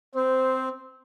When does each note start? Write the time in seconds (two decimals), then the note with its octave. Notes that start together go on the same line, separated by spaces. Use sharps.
0.15 C4 C5